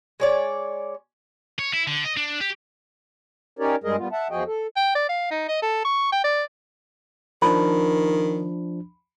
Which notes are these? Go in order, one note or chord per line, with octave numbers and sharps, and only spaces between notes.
G#3 C#5 D5
C#5
E4
D3
D#5
D4
G4
C#4 D#4 G4 A#4 C#5 D5
G2 G3 G#3 G#4 A#4 D#5
A#2 G3 B3 F4
E5 F#5 A5
E2 F3 F#4 G#4 D#5 G5
A4
G5
D5
F5
D#4
D#5
A4
C#6
G5
D5
D#3 F3 D4 B5